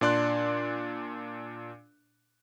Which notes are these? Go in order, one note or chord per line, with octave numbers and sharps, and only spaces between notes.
A#2 D4 D5 C6 F#6